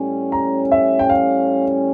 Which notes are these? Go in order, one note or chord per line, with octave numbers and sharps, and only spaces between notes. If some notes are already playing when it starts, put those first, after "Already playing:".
Already playing: A2 G3 C#4
A#5
E5
G5
F5